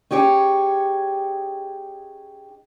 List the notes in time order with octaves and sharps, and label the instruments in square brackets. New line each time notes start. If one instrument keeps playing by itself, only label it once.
[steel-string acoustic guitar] C#4 D#4 G4 G#4 C#5